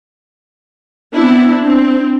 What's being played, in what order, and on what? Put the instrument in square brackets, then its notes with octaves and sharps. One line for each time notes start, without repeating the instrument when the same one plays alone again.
[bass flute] B3 [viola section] C4 D4 E4
[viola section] C4 [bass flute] D4